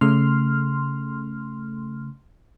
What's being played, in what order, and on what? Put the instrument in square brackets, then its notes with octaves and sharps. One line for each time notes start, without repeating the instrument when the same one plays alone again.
[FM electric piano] C#3 A3 C6 F6